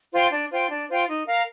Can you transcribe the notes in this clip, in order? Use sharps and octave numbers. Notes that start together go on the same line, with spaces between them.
F4 C5 G5
D4
F4 C5 G5
D4
F4 C5 G5
D#4
A#4 F5 A#5